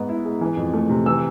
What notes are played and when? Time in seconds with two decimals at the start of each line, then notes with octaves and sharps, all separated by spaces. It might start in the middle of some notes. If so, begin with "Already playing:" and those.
Already playing: G#2 B3
0.09 E4
0.25 G#3
0.41 E3
0.57 F2
0.74 A3
0.89 C3
1.06 E3 E6